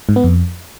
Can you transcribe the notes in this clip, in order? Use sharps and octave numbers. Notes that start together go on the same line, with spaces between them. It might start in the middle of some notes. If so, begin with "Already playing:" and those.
G#2
B3
F2